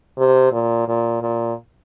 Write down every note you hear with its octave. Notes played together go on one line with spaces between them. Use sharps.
C3
A#2
A#2
A#2